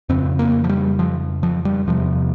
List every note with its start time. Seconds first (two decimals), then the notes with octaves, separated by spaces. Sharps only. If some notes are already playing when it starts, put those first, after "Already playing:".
0.09 F2 C#3 C4
0.39 A#3
0.64 F3
0.69 G3
0.99 F3
1.43 F3
1.65 G3
1.87 E2 C3 F3